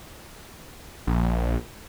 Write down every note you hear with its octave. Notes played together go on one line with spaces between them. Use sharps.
A#1